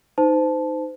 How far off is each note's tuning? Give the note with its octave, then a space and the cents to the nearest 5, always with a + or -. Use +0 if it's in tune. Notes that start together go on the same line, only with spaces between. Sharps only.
D#4 +0 C5 -30 A5 -10